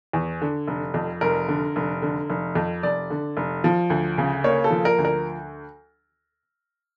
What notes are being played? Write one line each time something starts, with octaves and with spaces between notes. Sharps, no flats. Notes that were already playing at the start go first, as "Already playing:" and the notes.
E2
D3
F1
F2
F1 A#4
D3
F1
D3
F1
F2
F1 D5
D3
F1
F3
D2
C#3
A#3 C#5
A4
F3
A#4
D2
A#4